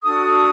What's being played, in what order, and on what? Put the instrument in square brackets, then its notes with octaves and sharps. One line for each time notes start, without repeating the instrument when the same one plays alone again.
[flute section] D4 F#4 A4 D#6